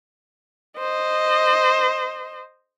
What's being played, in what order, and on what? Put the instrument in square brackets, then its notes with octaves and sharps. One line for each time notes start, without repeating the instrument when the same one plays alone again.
[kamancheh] C5 D#5